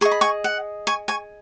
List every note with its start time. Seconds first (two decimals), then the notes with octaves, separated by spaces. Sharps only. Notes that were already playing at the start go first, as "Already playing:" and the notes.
0.01 G#4 D#5 C#6
0.11 B5
0.21 G#5 C#6
0.44 F#5
0.87 G#5 C#6
1.08 G#5 C#6